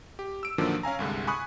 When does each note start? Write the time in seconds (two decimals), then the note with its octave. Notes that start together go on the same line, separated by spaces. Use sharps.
0.19 G4
0.43 E6 D7
0.58 A#2 D3 D#3 F3 F#3 D4
0.83 C#4 F5 G#5 A#5
0.99 C2 G2 D3 G#3
1.27 G#5 B5 C#6 D#6 F#6